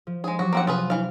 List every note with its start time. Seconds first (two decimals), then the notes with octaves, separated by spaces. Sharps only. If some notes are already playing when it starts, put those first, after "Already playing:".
0.07 F3
0.24 G#3 G#4
0.39 F#3 F#4 G4
0.53 A#3 C4 F#5
0.67 C3 F4 G#4 B4
0.90 E3 F5